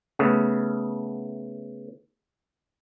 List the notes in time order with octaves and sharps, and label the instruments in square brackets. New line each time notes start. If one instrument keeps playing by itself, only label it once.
[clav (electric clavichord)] C#3 A3 B3